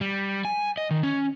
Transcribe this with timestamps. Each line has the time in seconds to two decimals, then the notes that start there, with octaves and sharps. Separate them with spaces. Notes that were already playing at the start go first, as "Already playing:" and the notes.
0.01 G3
0.45 G#5
0.77 D#5
0.91 D#3
1.03 C#4